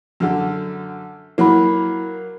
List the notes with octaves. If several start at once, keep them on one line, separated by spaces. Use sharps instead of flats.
F#2 D3
F#3 A#3 E4 B5